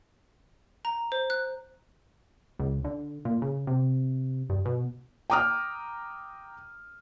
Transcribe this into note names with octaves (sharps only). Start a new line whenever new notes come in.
A#5
C5
F#6
C#2
D3
A#2
C#3
C3
G2
B2
G5 A#5 D6 D#6 F6